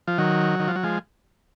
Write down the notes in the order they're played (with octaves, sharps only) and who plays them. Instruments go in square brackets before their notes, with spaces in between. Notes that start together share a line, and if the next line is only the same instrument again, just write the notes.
[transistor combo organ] F3
D#3 F#3
D#3
F3
F#3
F3 G#3